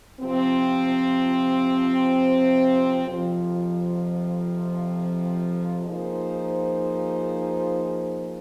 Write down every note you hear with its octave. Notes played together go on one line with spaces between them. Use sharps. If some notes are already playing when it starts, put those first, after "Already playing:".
C3 F3 C4
F2 C3 F3
F3 A#3 D#4 G#4 C5